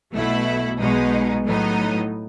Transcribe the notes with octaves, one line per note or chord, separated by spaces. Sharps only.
B1 B2 A3 E4
B1 B2 G#3 D#4
A2 F#3 B3 D#4